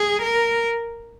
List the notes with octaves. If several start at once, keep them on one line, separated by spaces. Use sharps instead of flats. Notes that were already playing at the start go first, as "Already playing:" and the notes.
Already playing: G#4
A#4